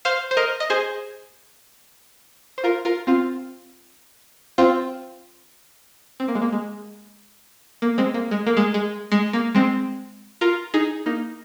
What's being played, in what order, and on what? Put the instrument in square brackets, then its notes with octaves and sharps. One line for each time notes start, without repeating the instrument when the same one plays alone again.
[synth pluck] C5 F5
C5
A#4 D#5
D#5
G#4 C5
C5
F4 A#4
F4 A#4
C4 F4
C4 F4
C4
A#3
G#3
A#3
G#3
A#3
G#3 C4
A#3
G#3
A#3
G#3
G#3
G#3
A#3
G#3 C4
F4 A#4
D#4 G#4
A#3 D#4